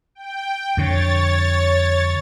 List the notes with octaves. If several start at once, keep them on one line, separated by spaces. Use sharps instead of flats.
G5
F2 D3 C#5 A6